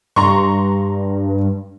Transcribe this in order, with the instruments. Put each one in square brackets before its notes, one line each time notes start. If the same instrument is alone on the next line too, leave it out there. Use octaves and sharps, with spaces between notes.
[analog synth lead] G2 [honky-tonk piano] A#5 C6 C#6